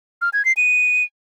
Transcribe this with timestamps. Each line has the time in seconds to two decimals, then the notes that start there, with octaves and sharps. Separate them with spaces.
0.22 F6
0.33 G#6
0.45 C7
0.57 D#7